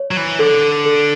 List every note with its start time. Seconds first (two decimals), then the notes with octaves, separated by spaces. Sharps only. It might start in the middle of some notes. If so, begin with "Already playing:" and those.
Already playing: C#5
0.11 F#3
0.17 E3
0.39 D3 A4
0.86 A4